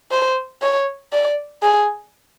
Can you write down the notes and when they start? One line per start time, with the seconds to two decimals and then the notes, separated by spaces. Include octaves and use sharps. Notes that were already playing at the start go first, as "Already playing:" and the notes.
0.11 C5
0.62 C#5
1.13 D5
1.63 G#4